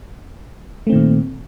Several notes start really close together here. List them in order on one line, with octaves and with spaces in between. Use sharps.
A3 C4 D#3 A#2